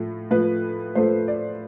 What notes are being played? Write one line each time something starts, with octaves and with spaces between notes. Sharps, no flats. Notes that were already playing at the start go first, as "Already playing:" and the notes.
Already playing: A2 F3 A3
A2 F3 A3 B4
A2 F3 A3 C5
D5